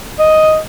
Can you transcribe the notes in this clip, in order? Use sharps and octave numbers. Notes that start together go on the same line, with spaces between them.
D#5